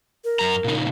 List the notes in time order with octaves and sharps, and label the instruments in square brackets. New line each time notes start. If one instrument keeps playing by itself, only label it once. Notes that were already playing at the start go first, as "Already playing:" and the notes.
[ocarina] A#4
[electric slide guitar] F#2 A#5
A#2 C#3 D#4